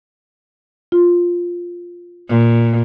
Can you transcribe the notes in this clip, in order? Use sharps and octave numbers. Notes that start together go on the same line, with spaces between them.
F4
A#2